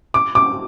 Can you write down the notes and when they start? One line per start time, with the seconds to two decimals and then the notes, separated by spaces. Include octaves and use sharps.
0.14 D6
0.35 D6